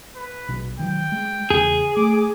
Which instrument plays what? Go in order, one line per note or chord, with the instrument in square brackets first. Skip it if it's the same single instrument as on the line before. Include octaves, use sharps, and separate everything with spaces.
[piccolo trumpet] B4
[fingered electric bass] A#1 B2
[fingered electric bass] D#3 F#3 [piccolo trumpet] G5
[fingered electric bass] G#3
[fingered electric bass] E2 C#3 [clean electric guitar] G#4
[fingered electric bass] A3 [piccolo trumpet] D6